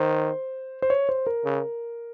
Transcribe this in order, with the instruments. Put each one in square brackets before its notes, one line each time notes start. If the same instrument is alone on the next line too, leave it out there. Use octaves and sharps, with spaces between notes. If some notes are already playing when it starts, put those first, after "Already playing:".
Already playing: [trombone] D#3 [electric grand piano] C5
[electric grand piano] C5
C#5
C5
A#4
[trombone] C#3